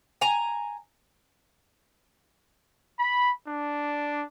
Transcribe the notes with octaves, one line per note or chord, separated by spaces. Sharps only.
G#5 A#5
B5
D4